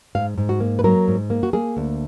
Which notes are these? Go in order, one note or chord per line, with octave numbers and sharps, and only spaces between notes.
G#2 F5
G#2
F#4
A#3
B4
F#3 A#4
G#2
A#3
F#4
A#3 G#4
D2